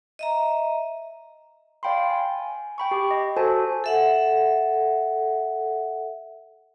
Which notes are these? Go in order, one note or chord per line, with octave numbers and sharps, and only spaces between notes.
D#5 E5 A#5
D5 F5 G5 B5 C6
G#5
G5 B5 C#6
G4 D6
D#5
F#4 A4 C5 G#5 A5
A4 E5 F#5